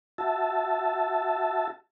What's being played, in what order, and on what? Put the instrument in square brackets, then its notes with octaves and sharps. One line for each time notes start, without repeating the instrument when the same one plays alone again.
[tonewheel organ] F#4 E5 A5